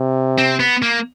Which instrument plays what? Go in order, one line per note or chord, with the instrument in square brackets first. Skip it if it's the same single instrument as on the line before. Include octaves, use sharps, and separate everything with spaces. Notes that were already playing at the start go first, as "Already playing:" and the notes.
Already playing: [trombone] C3
[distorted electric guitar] C4
B3
A#3